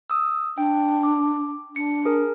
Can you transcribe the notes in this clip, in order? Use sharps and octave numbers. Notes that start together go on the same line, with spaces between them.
D#6 E6
D4 G5
D6
D4 C#7
G#4 A#4